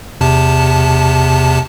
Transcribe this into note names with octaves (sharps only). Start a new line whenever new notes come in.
E2 C3 A5